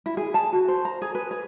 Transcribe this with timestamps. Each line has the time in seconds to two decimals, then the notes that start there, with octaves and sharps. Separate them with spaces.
0.06 E4
0.17 G#4
0.34 A5
0.53 F#4
0.68 C5
0.85 A#5
1.02 G#4
1.15 B4
1.31 G#4